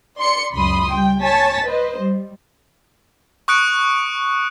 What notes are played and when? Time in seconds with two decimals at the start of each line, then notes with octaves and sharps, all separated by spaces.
0.18 D5 C6 C#7
0.54 C#2 F#2 B5 C6 D#6
0.92 G3 G5
1.22 C#5 G#5 A5 A6 B6
1.65 B4 C5 D#5
1.96 G3
3.48 C#6 D#6 F#6 C#7 D7